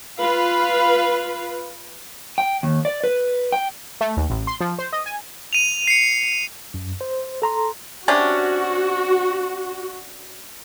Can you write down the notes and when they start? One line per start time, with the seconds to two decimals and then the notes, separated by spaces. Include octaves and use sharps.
0.19 F4 B4 F5
2.38 G5
2.63 D#2
2.85 D5
3.04 B4
3.52 G5
4.01 A3
4.17 D#2
4.30 A1
4.47 C6
4.60 F3
4.79 C5
4.93 D#5
5.06 G#5
5.53 D#7 F7
5.87 C7 C#7
6.74 F#2
7.01 C5
7.42 A4 A#5 C6
8.08 C3 C#4 D4 F#4